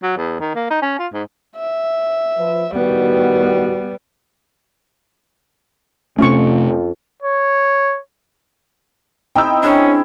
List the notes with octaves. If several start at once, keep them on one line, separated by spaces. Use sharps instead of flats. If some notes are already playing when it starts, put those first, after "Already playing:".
F#3
E2
D#3
A#3
D#4
C#4
F4
G#2
E5
F3 B4
A2 D#3 G3 B3 F#4
F2 C3 A3 C#4 F4 C#6
C#5
C4 D#4 E4 G5 D#6 E6
C#4 D4 E4 G#4